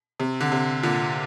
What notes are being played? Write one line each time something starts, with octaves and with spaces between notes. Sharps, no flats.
C3
D3
C3
A#2 D3